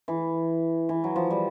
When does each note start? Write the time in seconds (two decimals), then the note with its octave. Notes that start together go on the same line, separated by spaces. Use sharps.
0.08 E3
0.89 E3
1.04 F#3
1.16 F3
1.31 G3